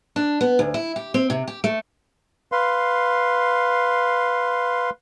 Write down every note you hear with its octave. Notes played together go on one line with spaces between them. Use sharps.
D4
B3
D2
E4
G4
C4
C3
G4
A3
B4 F5 C6